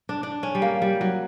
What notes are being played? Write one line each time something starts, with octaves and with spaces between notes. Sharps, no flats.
D4
D4
C#4
G3
A#3
G3
F#3